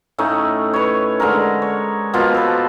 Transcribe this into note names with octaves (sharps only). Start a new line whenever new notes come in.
A2 A3 C#4 D#4
B4 C#5
D3 G#3 A4 A#4
C#5
B2 F3 A#3 F4
A4 B4